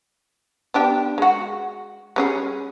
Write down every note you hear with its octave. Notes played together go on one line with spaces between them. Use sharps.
B3 D4 G4
G#3 F#4
G3 C#4 G#4